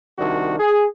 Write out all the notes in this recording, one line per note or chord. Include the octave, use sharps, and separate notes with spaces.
C2 D#3 D4 F#4
G#4